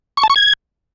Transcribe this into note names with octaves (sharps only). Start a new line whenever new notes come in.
C#6
A5
C#6
G#6